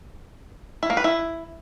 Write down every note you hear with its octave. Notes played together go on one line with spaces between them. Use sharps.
E4
A#3
B4
E4